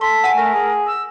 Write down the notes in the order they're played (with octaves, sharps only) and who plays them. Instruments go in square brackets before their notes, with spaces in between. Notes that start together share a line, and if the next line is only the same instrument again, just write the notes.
[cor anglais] A4 [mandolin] C6 [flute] B6
[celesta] F#5 [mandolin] G#5 A5 E6
[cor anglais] A3 [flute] A#4
[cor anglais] G#4
[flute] E6